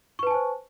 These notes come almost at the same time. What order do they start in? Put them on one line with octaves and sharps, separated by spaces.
C#6 B4 A5 G#5 C5